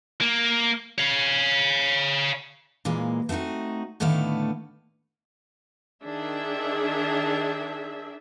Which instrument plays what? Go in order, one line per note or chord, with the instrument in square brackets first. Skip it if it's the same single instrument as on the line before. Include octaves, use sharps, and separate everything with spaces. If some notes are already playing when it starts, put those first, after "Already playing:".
[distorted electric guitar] A#3
C#5 F5
[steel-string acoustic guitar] A#2 E3 G#3 A#3
A3 B3 C4 D#4 F#4
A2 D3 D#3 A3 B3 F5
[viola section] D#3 D4 G#4 E5